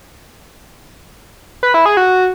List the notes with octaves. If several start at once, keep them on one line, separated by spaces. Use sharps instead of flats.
B4
E4
G#4
F#4